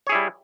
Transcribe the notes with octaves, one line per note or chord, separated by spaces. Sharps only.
G3 E4 G#4 C#5